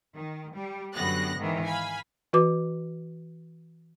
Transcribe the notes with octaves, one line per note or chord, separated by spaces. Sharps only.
D#3
G3
F#2 D3 G3 B3 F#6 A#6
G#2 D#3 E3
F5 G#5 B5
E3 F#4 B4 D6